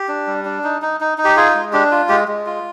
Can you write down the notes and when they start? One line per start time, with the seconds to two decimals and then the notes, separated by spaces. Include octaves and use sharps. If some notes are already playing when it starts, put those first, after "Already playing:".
Already playing: G4
0.08 D4
0.27 G3
0.45 D4
0.64 D#4
0.82 D#4
1.01 D#4
1.18 D#4
1.25 G4
1.36 F4 G#4
1.55 G#3
1.73 D4 G4
1.92 F4
2.09 G#3 G4
2.28 G#3
2.46 F4